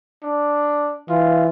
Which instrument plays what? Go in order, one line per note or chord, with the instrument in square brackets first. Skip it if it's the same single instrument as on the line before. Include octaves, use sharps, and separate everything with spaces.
[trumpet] D4
[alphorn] E3 [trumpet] F4